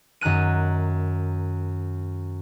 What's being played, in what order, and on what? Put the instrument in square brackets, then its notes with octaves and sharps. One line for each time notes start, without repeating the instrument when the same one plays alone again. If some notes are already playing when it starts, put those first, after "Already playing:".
[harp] F#2 D#3 A#5 F#6 D#7